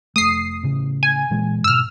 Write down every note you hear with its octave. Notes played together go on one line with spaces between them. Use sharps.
F1 A3 D#6 C7
A2 C#3
G#5
A#2 E3 G#3
G#2 B2 E6 F6